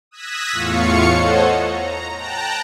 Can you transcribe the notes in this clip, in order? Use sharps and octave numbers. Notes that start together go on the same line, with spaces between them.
D#6 E6 F#6 G#6 A#6 B6
E2 A2 F4 F5 C#6 C#7
A4 C5 C#5 D#5 F#5
A#5
G5 A5 A#5 F#6